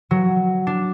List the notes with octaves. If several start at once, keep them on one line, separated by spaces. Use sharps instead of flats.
F#3
D4